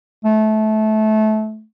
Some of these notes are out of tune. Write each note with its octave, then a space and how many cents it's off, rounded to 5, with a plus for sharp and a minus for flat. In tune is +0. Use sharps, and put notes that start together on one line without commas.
A3 -25